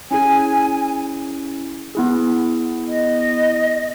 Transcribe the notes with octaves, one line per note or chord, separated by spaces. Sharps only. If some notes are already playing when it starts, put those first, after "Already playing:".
C#4 E4 G#4 G#5
B3 E4 G#4
D#5